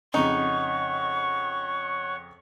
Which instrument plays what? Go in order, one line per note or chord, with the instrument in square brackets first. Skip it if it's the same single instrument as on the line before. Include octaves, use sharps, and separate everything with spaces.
[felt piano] F2 C#3 [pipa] D#4 [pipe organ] C#5 F#5 [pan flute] C#6